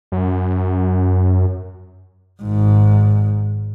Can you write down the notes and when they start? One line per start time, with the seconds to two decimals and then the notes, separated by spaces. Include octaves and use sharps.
0.12 F#2
2.42 G#1 G#2